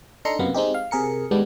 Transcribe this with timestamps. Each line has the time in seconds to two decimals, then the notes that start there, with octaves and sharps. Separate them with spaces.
0.25 D4 D#4 A4 A#5 C6 C#7
0.39 F#2 C3 A#3 B3
0.54 G#3 C4 D#4 G4
0.74 F5
0.91 C3 G#4 A#4 C#7
1.31 G#2 D#3 G3 G#3 B3 D4